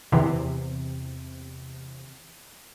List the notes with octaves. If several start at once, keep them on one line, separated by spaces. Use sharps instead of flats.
E2 C3